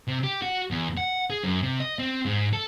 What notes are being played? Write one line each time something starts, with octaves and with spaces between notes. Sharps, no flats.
C3
G4
F#4
E2
F#5
G#4
F#2
C3
D#5
C4
G#2
A4